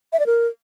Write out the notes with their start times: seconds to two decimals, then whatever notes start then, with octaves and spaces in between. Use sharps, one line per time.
0.13 E5
0.19 D5
0.26 A#4